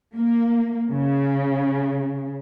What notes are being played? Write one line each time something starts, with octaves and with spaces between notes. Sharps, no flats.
A#3
C#3